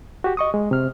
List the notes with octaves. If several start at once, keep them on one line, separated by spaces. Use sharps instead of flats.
F#4 G4
D#5 C#6 D#6
G#3
C3 F6